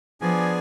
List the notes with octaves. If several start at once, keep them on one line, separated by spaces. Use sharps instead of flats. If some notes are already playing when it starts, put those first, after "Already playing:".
F3 B3 D4 G#4 D5 G#5